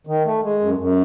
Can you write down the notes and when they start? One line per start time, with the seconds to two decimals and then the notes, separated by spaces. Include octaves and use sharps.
0.07 D#3
0.25 A3
0.43 G#3
0.60 F#2
0.78 F#2